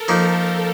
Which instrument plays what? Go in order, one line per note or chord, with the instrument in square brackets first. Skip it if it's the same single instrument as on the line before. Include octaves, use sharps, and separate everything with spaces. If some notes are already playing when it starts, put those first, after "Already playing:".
Already playing: [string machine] A4 A#4
[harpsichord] F3 A#3 D#4